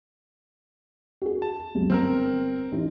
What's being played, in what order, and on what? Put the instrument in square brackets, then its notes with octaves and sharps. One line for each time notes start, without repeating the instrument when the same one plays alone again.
[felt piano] F#4 G#4
[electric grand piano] A5
[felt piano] C#2 F#2
[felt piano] G1 F6 [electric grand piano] C4 A#4
[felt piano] A1 D#4 E4